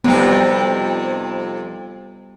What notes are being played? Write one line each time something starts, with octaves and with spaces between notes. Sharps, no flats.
F2 C3 G3 B3 D#4